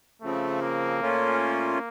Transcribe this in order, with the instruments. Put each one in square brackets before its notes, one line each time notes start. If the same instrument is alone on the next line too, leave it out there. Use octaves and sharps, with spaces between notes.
[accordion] C#3 F3 C4 [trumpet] A3
[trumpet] A#3
[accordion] A#2 A3 C#4 F4